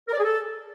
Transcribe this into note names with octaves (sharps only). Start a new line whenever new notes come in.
A#4
D5
G#4
A4